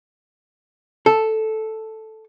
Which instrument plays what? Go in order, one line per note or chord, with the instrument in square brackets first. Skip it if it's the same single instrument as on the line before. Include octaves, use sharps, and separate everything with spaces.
[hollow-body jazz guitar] A4